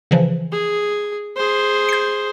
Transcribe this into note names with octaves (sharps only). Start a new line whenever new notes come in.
C#3 E3 F3
G#4
G#4 C5
G6 C7